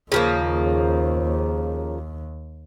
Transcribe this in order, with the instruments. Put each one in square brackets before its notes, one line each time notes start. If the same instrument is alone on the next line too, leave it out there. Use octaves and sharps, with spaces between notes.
[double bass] D#2 [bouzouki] C#3 F3 A#3